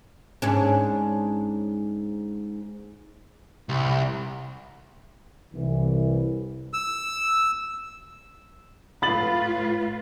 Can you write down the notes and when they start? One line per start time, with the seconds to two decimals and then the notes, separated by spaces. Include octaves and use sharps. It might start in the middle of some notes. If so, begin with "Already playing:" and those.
0.42 G#2 C#4 D4
3.69 C2
5.54 C2 E3
6.73 E6
9.02 A2 F4 B4 B5 A6 F#7